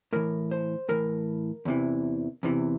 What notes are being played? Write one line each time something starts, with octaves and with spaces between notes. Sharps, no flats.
A2 E3 A#4
C5
A2 E3 A#4
E2 C3 E3
E2 C3 E3